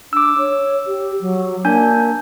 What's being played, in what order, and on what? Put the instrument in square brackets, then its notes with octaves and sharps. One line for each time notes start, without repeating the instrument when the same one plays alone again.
[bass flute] D4 [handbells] D6 E6
[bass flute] C#5
G4
F#3
[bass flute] A#3 [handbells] D4 G#5 G6